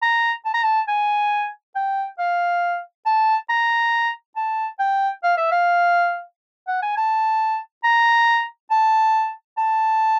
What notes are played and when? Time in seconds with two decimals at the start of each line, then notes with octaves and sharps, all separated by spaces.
0.02 A#5
0.45 A5
0.54 A#5
0.63 A5
0.88 G#5
1.76 G5
2.19 F5
3.06 A5
3.49 A#5
4.36 A5
4.79 G5
5.23 F5
5.38 E5
5.51 F5
6.68 F#5
6.82 G#5
6.97 A5
7.84 A#5
8.71 A5
9.58 A5